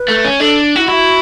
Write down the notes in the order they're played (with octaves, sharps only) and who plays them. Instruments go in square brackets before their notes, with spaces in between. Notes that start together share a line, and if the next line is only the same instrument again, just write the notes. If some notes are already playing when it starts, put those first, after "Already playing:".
Already playing: [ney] B4
[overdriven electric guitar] A3
C#4
[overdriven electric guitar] D4 [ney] A4
[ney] E4 [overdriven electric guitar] F#4
[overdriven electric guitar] E4 [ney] F#4